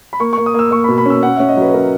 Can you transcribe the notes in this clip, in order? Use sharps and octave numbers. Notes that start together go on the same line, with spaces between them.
B5
A#3 C#6
A#3 C#6
D#6
A#3 E6
A#3 C#6
B2 B5
B5
C#4 E6
C#4 F#5
C#4 E5
D#5
F#3 B4
B4
C#4 A#4